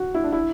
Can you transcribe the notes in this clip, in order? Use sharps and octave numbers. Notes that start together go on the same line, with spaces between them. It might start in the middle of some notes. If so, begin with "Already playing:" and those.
Already playing: F#4
E4
D4
E4